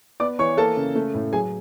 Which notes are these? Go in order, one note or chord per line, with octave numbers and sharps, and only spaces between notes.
B3 D5 D6
E3 C#5 C#6
A#3 A4 A5
C#3
A3
A2
F#3 G#4 G#5